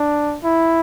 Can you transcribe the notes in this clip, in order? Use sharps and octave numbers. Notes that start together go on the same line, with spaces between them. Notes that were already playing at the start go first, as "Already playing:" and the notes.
Already playing: D4
E4